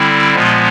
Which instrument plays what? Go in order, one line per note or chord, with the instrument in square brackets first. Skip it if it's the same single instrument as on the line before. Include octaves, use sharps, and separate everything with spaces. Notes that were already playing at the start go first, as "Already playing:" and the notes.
Already playing: [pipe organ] D3 G3 C4 E4
A#2 F3 G#3 B3